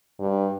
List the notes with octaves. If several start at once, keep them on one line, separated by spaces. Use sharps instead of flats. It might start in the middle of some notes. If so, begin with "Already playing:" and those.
G2